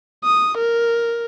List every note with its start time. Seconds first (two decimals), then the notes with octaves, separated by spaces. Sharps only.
0.24 D#6
0.58 A#4